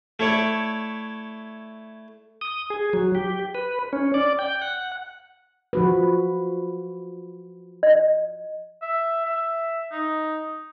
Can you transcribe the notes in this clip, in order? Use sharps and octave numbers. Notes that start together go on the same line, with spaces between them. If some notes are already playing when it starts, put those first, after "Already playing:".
A3 E4 C#5 D5
D#6
G#4
F#3
G4
B4
C#4
D5
G5
F#5
F3 F#4 B4
D#5
E5
E5
D#4